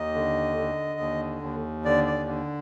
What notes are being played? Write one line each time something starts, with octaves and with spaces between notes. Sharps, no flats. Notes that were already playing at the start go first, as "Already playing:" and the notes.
Already playing: D#2 D#5
D3
D3
D#2
D#2
D3 D5
D5
D3